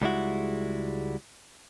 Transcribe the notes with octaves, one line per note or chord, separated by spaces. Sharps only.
C#2 G3 G#3 E4 F#4